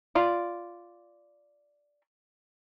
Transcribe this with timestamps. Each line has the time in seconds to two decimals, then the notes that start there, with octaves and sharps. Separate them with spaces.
0.15 F4 D5